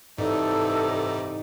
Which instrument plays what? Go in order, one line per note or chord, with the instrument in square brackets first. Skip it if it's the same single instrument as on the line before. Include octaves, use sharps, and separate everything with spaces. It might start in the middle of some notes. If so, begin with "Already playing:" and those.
[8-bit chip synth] G#2 [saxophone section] C3 E3 D5 [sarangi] D#4 [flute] A4